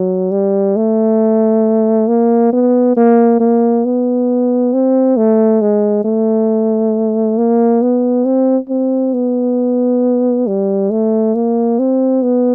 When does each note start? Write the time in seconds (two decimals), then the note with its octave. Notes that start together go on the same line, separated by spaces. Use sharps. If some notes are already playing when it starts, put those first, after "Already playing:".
Already playing: F#3
0.31 G3
0.76 A3
2.08 A#3
2.53 B3
2.97 A#3
3.40 A#3
3.85 B3
4.73 C4
5.17 A3
5.61 G#3
6.05 A3
7.38 A#3
7.82 B3
8.25 C4
8.69 C4
9.14 B3
10.47 G3
10.90 A3
11.34 A#3
11.79 C4
12.23 B3